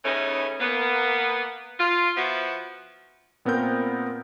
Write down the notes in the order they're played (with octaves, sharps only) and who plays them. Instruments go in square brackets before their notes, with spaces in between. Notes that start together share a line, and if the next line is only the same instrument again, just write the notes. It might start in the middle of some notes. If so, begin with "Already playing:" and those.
[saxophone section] C#3 E3 A3 B3 C#4 D#4
A#3 B3
F4
F3 B3 E4 F#4
[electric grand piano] A#2 B3 C4 A#4 G6